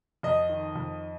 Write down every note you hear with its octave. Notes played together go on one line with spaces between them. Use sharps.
F2 D#5
D#3
F2